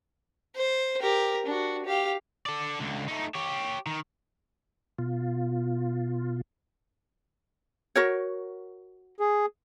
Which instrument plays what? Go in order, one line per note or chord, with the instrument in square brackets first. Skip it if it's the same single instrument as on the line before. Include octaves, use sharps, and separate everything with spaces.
[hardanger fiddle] C5
G4 A#4
D4 F#4
G4 F5
[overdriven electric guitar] A4 D5
C#2 D3
A3 D#4
G4 C#5
D#3
[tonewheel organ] B2 F4
[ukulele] F#4 A#4 C#5
[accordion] G#4